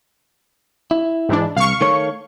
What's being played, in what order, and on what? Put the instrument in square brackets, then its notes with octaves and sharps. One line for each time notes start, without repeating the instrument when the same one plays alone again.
[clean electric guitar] E4
[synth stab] G#2 E3 D4
[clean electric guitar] C2 [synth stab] F5 C#6
[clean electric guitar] D#3 A3 C#5